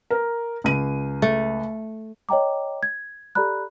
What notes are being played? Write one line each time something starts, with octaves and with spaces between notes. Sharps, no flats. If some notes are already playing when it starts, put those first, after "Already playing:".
A#4
C#2 D#7
A3
C#5 D#5 G5 A#5 D6
G#6
G4 A4 D5 A#5 B5 F#6